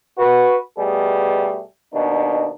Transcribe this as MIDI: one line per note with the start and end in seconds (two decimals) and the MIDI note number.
0.19 0.56 66
0.19 0.56 71
0.78 1.61 47
0.78 1.61 55
0.78 1.61 57
0.78 1.61 68
1.94 2.50 39
1.94 2.50 47
1.94 2.50 62
1.94 2.50 63